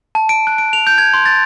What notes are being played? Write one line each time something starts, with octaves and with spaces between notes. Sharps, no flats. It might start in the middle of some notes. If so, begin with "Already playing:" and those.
A5
D7
F#6
D7
F7
G6
G#6
C6
A6